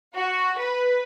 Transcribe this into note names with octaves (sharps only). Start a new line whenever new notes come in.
F#4
B4